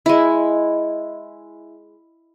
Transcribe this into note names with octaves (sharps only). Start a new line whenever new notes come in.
G#3 E4